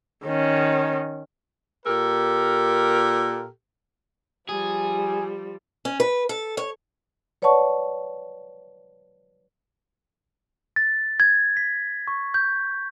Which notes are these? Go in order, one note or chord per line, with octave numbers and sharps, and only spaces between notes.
D#3 C#4
A#2 G4 A4 A#4
F3 G3 G#4
C#4
B4
A4
C#5
B4 C#5 D5 F#5 A5 C#6
A6
G#6
B6
C#6
G6